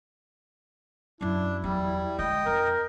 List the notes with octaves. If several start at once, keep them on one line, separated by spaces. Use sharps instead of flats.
F#2 F#3 D4 E4
E2 F#3 G3
D3 G#3 D#5 G5
F2 A#4